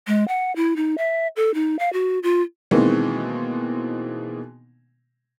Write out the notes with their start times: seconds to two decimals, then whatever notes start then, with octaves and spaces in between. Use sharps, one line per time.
0.07 G#3
0.28 F#5
0.56 E4
0.76 D#4
0.98 E5
1.36 A4
1.54 D#4
1.79 F5
1.93 F#4
2.23 F4
2.71 B2 D#3 E3 G#3 A#3 C4